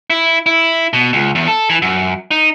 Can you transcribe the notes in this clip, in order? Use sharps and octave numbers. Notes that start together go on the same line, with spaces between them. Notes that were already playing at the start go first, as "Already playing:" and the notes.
E4
E4
B2
C#2
E2
A4
E3
F#2
D#4